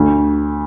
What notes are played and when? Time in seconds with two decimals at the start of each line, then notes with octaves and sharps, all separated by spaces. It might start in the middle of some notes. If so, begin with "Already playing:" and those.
Already playing: D2